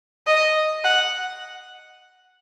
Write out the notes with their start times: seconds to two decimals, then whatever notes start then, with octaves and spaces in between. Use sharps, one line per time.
0.27 D#5
0.84 F#5